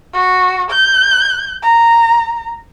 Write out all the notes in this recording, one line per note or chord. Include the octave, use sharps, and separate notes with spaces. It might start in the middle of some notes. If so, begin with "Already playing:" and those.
F#4
G6
A#5